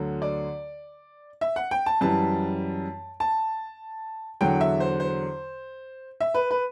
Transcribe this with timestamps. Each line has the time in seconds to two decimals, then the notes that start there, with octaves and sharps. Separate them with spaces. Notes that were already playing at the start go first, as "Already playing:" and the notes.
Already playing: D2 D3 F#3
0.22 D5
1.41 E5
1.56 F#5
1.71 G5
1.86 A5
2.01 F#2 E3 G3 A5
3.20 A5
4.41 E2 D3 F#3 G5
4.61 E5
4.80 C5
5.00 C5
6.21 E5
6.34 B4
6.51 B4